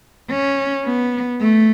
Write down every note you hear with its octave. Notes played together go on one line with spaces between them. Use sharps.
C#4
B3
A3